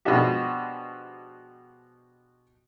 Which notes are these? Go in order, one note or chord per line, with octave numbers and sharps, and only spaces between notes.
B2 F3 G#3 D4 F#4 G4